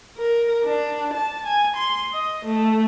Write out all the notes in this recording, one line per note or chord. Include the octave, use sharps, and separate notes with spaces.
A#4
D4
A5
G#5
C6
D#5
A3